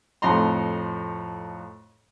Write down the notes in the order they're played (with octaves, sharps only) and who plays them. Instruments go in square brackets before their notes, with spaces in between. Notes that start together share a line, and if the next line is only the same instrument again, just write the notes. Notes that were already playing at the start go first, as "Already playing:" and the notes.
[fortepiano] F2 A2 D#4 A#5 C6